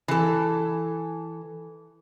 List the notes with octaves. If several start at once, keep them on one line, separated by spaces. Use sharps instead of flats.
E3 A4